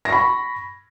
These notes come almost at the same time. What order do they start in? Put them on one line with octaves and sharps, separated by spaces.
A#6 C#6 B5